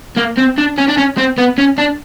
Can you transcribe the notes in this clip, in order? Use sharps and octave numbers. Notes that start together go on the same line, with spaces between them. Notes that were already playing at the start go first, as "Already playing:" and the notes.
A#3
C4
D4
C#4
D4
C#4
C4
B3
C#4
D4